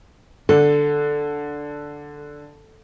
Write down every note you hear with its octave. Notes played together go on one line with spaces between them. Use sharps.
D3 A4